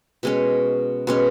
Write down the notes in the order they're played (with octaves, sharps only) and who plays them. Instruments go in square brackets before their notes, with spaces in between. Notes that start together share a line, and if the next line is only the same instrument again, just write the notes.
[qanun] B2 G#3 C#4
B2 G#3 C#4